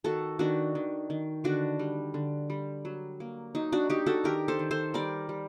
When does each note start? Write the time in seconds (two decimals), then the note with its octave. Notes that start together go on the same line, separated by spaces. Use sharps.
0.04 D#3 F#4 A4
0.39 D#3 D4 F#4
0.75 D#3
1.10 D#3
1.44 D3 D4 F#4
1.79 G3
2.14 D3
2.50 G3
2.85 F#3
3.20 A#3
3.55 F#3 D#4
3.72 D4 F#4
3.89 D4 D#4 G4
4.06 F#4 A4
4.24 D#3 G4 A#4
4.48 A4 C5
4.59 D#3
4.71 A4 C5
4.94 G3 A#4 D5
5.29 G3